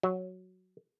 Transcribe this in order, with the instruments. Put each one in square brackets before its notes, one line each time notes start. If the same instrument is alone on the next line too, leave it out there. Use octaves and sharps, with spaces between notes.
[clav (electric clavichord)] F#3